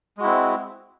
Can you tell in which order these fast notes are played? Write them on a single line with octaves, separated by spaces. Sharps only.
G#3 F#4 E4 C4